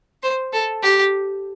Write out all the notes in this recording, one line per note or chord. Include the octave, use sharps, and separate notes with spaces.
C5
A4
G4